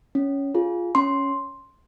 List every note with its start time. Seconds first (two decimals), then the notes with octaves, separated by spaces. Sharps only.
0.15 C#4
0.55 F4 G#4
0.95 C#4 C6